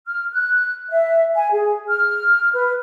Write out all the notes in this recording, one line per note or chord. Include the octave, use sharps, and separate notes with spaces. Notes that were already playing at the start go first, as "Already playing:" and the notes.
F6
F#6
E5
G#5
G#4
F6
B4